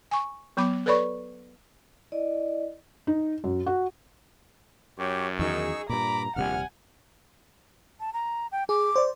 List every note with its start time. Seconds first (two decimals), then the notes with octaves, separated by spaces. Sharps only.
0.11 G#5 C#6
0.57 F#3 B3 B5 D6
0.86 A4 B4 C#5 D5 B5 C#6
2.12 E4 D5 D#5
3.07 D#4
3.44 F#2
3.66 F#4
4.99 F#2 G4 C#5
5.39 E2 D#3 F#3 D#4 G#4 C#6 E6
5.89 G2 A#2 A#5 B5 D6
6.36 D#1 A#1 C3 G3 F#5 G#5 F6
8.00 A5
8.14 A#5
8.52 G5
8.69 G#4 D6
8.96 C5 D5